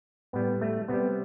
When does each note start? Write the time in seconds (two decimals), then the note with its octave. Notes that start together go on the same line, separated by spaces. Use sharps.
0.33 A2 G3 B3
0.61 A3
0.88 C3 G3 B3